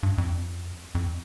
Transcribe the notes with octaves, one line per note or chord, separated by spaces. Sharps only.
G2
F2
F2